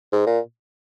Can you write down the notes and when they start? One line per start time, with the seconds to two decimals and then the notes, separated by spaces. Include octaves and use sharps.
0.12 G#2
0.26 A#2